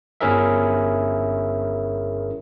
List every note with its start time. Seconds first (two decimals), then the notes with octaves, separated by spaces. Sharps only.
0.21 G1 C#4 E4 G#4 A#4 E5